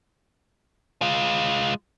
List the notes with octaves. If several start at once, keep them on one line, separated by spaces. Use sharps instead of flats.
G#3 F4